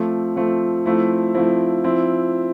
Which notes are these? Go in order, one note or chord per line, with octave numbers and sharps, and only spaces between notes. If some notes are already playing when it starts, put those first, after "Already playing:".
Already playing: F3 A3 C4
F3 A3 C4
F3 A3 C4 E4
F3 A3 C4 E4
F3 C4 E4